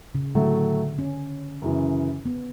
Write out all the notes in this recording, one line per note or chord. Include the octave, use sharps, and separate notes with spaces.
C#3
A2 D3 F#3 A3
C#4
F#2 C#3 E3
B3